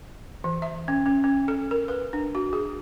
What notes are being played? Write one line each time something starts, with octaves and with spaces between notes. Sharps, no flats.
E3
E5
C#4
C#4
C#4
A4
A#4
B4
D4
F#4
G#4